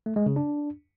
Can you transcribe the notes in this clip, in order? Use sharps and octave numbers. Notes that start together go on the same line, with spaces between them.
A3
G#3
C#3
D4